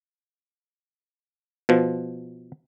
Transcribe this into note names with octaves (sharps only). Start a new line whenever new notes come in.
B2 F3